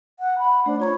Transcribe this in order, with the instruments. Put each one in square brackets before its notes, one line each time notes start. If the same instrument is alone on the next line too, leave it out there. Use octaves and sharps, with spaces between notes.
[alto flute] F#5
B5
[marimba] A3 C5 [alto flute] D4
[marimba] F4 A#5 B5 [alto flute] C#5